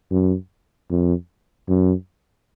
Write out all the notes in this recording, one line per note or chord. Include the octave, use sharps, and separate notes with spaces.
F#2
F2
F#2